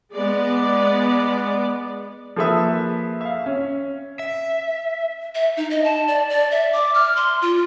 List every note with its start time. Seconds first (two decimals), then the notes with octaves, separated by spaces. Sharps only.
0.11 G#3 B3 D5
2.36 F3 A#3 G#4 A4 B4 E5
3.21 E5 F5
3.46 C#4
4.19 E5
5.35 E5
5.57 D#4
5.70 D#5
5.84 A5
6.08 D5
6.30 D5
6.51 E5
6.73 D6
6.94 F6
7.16 C6
7.42 F4